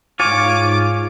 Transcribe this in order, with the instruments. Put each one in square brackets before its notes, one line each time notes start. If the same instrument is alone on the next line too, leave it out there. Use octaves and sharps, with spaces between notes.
[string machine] G#2 [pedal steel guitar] F4 C#5 G#5 [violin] D6